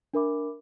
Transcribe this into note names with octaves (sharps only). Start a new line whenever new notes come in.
D4 A#4 E5 B5 D6